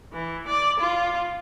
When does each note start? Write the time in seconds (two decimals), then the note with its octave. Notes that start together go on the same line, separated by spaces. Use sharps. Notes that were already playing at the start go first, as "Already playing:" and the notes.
0.13 E3
0.48 D5
0.80 F4